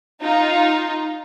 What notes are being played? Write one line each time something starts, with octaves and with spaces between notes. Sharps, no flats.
D#4 F4